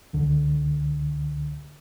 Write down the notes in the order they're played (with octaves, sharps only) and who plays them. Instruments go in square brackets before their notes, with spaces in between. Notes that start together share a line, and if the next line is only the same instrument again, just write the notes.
[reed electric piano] C#2 D3